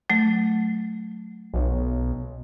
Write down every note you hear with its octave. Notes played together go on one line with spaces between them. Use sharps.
F#3 A3
B1